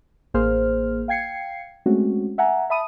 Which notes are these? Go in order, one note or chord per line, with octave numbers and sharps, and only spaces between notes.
A1 A#3 G#4 C5 F6
F5 G5 G#6 C7 C#7
G#3 A3 C4 C#4 F#4
E5 F#5 G#5 A#5
E5 A5 B5 D#6 D#7